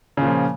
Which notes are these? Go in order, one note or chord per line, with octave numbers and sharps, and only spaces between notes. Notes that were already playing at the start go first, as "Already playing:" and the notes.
A#2 C#3 F3